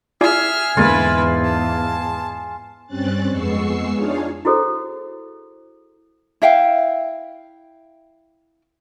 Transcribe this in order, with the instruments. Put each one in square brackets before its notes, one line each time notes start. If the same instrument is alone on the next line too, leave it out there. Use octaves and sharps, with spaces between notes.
[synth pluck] E4 F4 D5 [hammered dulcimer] G#4 [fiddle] E5 F6
[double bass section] E2 G#2 [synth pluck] D3 G#3 A#3 [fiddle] E4 B4 [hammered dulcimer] F4
[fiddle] A5
[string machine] G2 G3 C4 C#4 F#6 A6
F2 G#3 B3 C#6 E6 C7
D4 D#4 F4 G#4 C#5 F5
[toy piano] E4 F#4 G#4 A4 C5
[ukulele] E4 E5 F5 G5